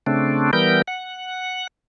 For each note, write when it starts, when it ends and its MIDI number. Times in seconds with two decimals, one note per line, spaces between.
0.06 0.51 49
0.06 0.51 57
0.06 0.51 60
0.06 0.51 62
0.53 0.82 52
0.53 0.82 55
0.53 0.82 59
0.53 0.82 70
0.53 0.82 91
0.88 1.67 78